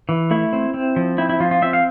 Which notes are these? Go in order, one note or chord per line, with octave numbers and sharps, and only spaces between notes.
E3
A3 E4
C4
C4
F3
C4 E4
E4
F3 F4
F4
C4 E5
F5